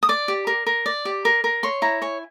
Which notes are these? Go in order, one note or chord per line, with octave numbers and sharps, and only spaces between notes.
D#6
D5 D6
G4
A#4
A#4
D5
G4
A#4
A#4
C#5 C6
E4 A#5
C#5 G#5